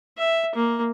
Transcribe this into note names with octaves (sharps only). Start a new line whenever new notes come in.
E5
A#3